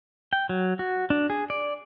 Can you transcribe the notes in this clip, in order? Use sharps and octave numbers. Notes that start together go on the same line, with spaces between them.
G5
F#3
F#4
D4
G#4
D5